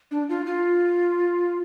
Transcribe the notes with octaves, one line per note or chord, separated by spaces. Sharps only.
D4
F4
F4